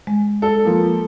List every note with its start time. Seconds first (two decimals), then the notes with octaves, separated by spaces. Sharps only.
0.07 G#3
0.42 A4
0.65 F3 A#3